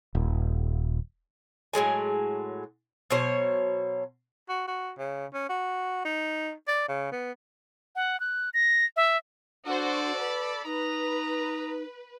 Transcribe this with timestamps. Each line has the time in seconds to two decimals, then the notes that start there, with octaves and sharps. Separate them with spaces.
0.15 D#1
1.73 A2 F#3 G#3 G#5
3.10 B2 F#3 C5 C#5
4.49 F#4
4.68 F#4
4.98 C#3
5.34 C#4
5.49 F#4
6.05 D#4
6.68 D5
6.88 C#3
7.12 B3
7.96 F#5
8.20 F#6
8.54 A#6
8.96 E5
9.66 D4 F#4 A4 C5 D5
10.20 B4 B5
10.65 D#4 B4 D#5 A#5